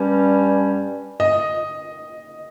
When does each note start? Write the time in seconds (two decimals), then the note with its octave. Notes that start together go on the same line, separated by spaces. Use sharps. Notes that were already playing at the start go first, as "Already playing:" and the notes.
Already playing: G2 G3 C#4
1.20 D#5